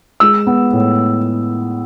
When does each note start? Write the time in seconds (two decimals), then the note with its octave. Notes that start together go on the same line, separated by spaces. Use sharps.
0.20 G#3 E6
0.47 B3
0.73 A2